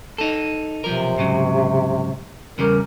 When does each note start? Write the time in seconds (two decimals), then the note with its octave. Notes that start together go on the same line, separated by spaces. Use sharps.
0.18 D#4 A4
0.84 B1 C3 F3 A#4
1.18 G#2 C#3 F#3
2.58 E2 C#3 G3 A#4